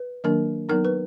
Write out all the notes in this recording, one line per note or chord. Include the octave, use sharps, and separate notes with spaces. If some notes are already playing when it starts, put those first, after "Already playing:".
Already playing: B4
D#3 F#3 A#3 D4 A#4
F#3 B3 D#4 A#4
B4